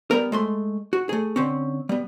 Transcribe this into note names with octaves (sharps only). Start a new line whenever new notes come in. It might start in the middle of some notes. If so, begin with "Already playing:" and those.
G3 B3 A#4
G#3 A3 C6
F#4
A3 G#4
D3 C4 C#4
G3 B3